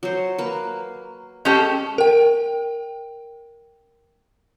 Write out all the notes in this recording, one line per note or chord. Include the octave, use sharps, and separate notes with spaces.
F#3 C5
A#3 B4
G#3 C#4 G4 A4
A#4 G5